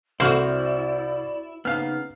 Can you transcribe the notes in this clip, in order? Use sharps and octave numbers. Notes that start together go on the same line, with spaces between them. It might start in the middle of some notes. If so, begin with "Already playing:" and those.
C2 E4 F#4 C5 D5 F6
C#3 B3 D#4 F5 F6